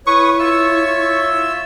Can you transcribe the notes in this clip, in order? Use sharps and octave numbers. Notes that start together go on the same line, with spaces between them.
E4 B4 C#5 C#6 D#6
F4 E5 E6